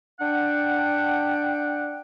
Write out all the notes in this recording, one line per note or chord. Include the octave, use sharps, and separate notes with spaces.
D4 F#5 G5